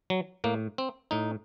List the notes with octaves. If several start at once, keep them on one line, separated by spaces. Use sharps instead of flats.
F#3
A2 A#3
C4
A2 D#4